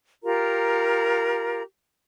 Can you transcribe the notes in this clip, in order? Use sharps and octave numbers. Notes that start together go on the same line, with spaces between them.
F4 G4 A#4 A#5